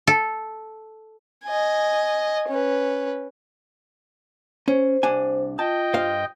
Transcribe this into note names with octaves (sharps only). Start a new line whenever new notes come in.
A4
D#5 G#5
C#4 B4
C#4 C5
C2 D4 G#5
F4 D#5 G5 A5
G2 C5 F5